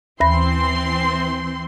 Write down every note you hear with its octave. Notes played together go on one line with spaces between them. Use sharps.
D#2 E3 C4 B5 C6 A#6